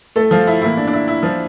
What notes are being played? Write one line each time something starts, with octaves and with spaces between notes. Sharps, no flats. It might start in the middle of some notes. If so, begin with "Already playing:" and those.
A3 A4
F3 F4
E4
A2 E3 A#3 E4
D4
D4
E4
E4
F3 F4